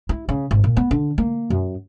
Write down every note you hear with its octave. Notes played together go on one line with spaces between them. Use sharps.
E4
C#3
G#1
A#2
B3
D3
A#3
F#2